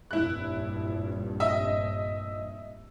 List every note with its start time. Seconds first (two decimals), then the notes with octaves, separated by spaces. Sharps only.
0.11 F1 A#1 G2 E4 F#6
1.40 D#5 E5